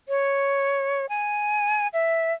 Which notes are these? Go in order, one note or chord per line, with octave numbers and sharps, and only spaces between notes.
C#5
G#5
E5